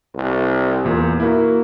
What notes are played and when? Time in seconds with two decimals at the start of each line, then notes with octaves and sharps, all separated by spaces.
0.14 C2
0.85 E2 A#2
1.20 A#3 E4 F#4